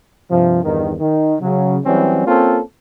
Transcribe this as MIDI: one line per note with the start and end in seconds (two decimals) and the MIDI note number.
0.30 0.62 43
0.30 0.62 48
0.30 0.62 53
0.63 0.93 40
0.63 0.93 43
0.63 0.93 51
0.99 1.35 51
1.40 1.77 49
1.40 1.77 54
1.85 2.24 52
1.85 2.24 54
1.85 2.24 55
1.85 2.24 60
1.85 2.24 61
2.27 2.60 58
2.27 2.60 60
2.27 2.60 61
2.27 2.60 65
2.27 2.60 69